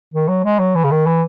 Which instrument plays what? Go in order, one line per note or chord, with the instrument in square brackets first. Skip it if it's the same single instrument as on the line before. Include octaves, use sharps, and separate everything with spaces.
[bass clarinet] D#3
F#3
G#3
F#3
E3
C#3
D#3
E3